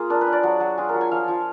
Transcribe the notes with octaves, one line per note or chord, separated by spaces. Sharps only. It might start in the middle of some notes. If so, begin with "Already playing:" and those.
Already playing: A#3 F4 G#4
D4 A#4
B4
D4
D5
F#3
F#3
F4 G#4
A#4
F#3
G#5
F3 F5
F3